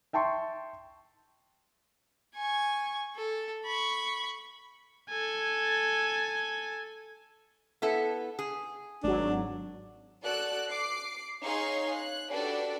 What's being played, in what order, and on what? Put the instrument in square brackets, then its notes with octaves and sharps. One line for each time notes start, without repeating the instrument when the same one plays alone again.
[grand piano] E5 G5 A5 C6 C#6
[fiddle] G#5 C#6
A4
B5 C#6
[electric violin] A4 G#5
[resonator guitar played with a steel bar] B3 E4 A4
G#4
[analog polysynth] G#1 F#3 [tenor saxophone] D4
[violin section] F#4 A4 D5 F#6
D6 C7
D#4 G#4 C#5 F5 C6 C#6
C#5 F#6
D4 F#4 G4 A4 B4 D5